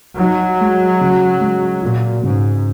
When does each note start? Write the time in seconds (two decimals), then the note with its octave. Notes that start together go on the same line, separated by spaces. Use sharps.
0.19 F#3 D#4
0.61 G#3
1.01 C#3
1.41 G#3
1.82 A#2 F#4
2.22 G#2 C#3